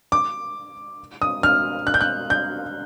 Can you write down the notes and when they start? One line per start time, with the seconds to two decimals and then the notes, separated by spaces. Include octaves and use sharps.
0.12 D6
1.22 D#6
1.43 F6
1.87 F#6
1.94 G6
2.01 F#6
2.30 G6